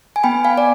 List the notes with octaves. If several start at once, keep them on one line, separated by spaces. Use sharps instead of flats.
G#5
B3 G5 B5
F5 G#5
D5